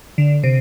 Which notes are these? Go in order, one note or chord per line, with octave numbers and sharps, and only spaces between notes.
D3
C3